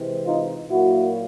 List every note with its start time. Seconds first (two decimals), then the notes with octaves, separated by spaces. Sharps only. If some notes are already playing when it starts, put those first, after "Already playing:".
Already playing: C3 E3 G#3 C4
0.25 D#4 F4
0.70 A#2 F#3 A#3 E4 F#4